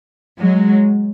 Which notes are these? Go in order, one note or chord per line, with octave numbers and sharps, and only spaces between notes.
F#3 G#3